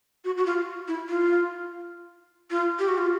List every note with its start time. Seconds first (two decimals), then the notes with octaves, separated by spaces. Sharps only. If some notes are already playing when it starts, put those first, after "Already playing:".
0.25 F#4
0.37 F#4
0.46 F4
0.88 E4
1.09 F4
2.51 F4
2.79 G4
2.88 F#4
2.98 F4